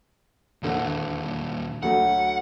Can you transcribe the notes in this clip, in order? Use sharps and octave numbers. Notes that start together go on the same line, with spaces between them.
E1 D#2 A#2 D3 F#5
D2 F#3 A3 F#5